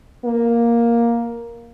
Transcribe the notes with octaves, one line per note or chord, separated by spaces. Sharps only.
A#3